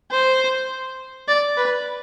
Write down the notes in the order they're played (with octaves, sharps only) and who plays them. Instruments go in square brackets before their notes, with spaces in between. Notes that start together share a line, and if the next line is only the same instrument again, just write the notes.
[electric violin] C5
D5
B4